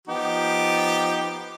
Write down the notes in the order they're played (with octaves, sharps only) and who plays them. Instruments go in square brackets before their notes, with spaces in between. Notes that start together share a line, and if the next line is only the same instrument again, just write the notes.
[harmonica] F3 G4 [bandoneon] B3 D#4